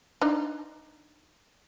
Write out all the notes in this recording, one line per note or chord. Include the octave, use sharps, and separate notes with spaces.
D4 D#4